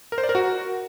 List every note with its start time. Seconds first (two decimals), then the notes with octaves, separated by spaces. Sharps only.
0.12 A#4
0.18 C5
0.23 D5
0.29 A#4
0.35 F#4